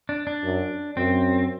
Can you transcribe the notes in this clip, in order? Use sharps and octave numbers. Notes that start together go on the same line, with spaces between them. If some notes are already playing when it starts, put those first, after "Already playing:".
D4
D4
F#2
F#2 C4